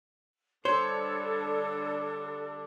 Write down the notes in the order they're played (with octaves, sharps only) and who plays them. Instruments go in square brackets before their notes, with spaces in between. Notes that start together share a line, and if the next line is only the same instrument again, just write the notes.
[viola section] D3 G3 D4 [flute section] A4 [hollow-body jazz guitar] C5 [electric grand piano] C#5